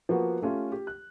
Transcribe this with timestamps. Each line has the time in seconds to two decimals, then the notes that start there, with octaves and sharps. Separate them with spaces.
0.09 F3 A#3 B3 F#4
0.42 A3 C#4 F4 G4
0.72 G4
0.87 F#6